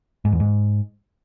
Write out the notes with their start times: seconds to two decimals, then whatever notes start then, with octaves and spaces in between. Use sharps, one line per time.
0.25 G#2
0.32 E2
0.40 G#2